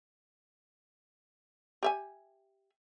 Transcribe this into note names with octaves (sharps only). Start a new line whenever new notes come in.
G4 E5 G#5